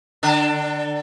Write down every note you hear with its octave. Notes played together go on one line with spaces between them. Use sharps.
D3 D4